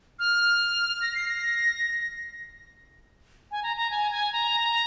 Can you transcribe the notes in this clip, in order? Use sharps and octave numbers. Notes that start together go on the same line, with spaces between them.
F6
A#6
C7
A#6
G#5
A#5
A#5
G#5
G#5
A#5